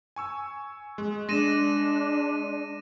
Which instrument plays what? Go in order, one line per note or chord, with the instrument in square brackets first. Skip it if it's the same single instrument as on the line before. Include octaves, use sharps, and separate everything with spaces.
[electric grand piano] G#5 C#6 E6
G#3
[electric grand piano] G#3 [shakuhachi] D4 [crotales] A#6 D#7 E7